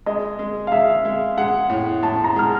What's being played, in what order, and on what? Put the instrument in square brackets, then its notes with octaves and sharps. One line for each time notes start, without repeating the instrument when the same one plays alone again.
[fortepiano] G#3 [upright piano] D#5
[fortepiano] G#3
[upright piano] F5
[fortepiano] G#3 [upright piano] E5
[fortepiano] G#3
[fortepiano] G#3 [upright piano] F#5
[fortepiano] A2
[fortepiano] A2 [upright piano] A5
[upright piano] A#5
[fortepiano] G#3 [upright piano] F6